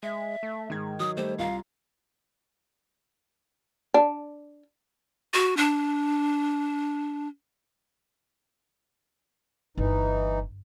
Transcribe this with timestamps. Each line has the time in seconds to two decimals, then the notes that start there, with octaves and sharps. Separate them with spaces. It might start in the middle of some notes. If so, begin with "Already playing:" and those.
0.03 G#3 E5
0.43 A3
0.70 G#2 D#3 G#6
1.00 F#3 D#6
1.17 G3 A3 C5
1.38 C2 F4 F5 A#5
3.94 D4
5.34 F#4
5.57 D4
9.77 G1 E3 D#4